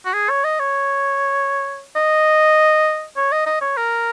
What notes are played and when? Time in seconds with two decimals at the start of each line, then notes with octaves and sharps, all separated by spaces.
0.06 F#4
0.14 G#4
0.30 C#5
0.45 D#5
0.60 C#5
1.96 D#5
3.17 C#5
3.32 D#5
3.46 D#5
3.61 C#5
3.77 A#4